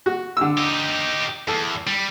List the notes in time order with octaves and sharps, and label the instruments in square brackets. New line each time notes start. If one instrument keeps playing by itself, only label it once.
[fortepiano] F#4
D3 E6
[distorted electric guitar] D#4 G4
[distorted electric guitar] E2 [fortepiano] A4
[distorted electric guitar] G3